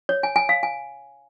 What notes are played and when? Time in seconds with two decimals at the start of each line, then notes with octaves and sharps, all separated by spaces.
0.09 C#5
0.23 G#5
0.36 G#5
0.49 F5
0.63 G#5